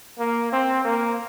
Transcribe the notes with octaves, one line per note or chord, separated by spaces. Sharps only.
A#3
C4
A#3